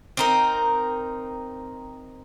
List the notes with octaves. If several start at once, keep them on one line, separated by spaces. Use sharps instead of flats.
C4 D#4 A#4